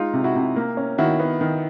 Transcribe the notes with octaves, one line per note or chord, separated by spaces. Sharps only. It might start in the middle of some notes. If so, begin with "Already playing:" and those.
Already playing: G#3 D#4 F4
C3
E4 F#4
C3
A#3
C#4
D#3 E4 F#4
B3
D#3